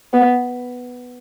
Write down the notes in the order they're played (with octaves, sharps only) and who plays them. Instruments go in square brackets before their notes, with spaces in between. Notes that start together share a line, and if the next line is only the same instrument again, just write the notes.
[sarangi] B3